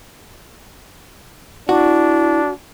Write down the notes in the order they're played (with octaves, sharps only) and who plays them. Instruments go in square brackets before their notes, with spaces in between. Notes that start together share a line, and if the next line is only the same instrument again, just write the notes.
[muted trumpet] D4 [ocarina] E4 [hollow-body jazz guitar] F#4